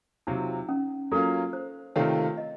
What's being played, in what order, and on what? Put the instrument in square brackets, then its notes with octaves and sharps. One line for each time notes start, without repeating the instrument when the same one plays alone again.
[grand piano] C3 F#3 C4 F4 [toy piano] D#4
[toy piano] C#4
[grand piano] F#3 A#3 C#4 F4 [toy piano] A4
[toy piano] C5
[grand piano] C3 D#3 A3 C4 F4 [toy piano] C#5
[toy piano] D#5